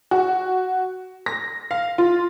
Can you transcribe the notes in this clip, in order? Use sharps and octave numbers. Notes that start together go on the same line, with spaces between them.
F#4
A#6
F5
F4